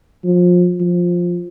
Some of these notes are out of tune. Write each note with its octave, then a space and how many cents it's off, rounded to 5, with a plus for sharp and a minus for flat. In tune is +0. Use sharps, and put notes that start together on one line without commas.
F3 +25
F3 +10